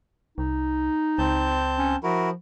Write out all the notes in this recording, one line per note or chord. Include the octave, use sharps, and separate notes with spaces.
C2 D#4
C#2 C4 A5 G6
C#4
F3 E4 F#4 A#4